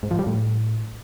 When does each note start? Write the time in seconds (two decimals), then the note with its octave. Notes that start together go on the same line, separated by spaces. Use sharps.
0.03 G#2
0.11 F3
0.19 G3
0.27 A2